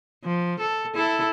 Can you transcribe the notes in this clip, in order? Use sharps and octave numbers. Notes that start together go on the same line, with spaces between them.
F3
A4
E4 A4